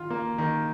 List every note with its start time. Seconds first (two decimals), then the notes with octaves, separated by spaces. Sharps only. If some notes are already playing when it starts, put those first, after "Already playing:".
Already playing: D#3 F4
0.10 A#3
0.38 D#3